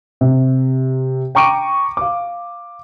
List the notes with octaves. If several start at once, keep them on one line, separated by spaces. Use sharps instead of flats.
C3
G5 A#5 C#6 D6 D7 D#7
F5 D6